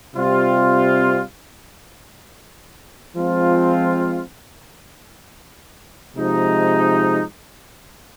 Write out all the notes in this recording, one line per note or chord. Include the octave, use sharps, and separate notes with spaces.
C3 G3 C4 F4
F3 G#3 C4 F4
C3 F3 G#3 D#4